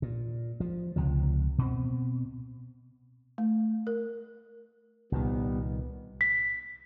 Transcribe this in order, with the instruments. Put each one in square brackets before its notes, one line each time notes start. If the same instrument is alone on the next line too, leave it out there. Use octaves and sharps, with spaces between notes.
[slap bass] A#2
F3
C#2 C3 F3
B2 C4
[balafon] A3
A#4
[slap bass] C2 A#2 D#3 [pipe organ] G3 B3
[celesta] B6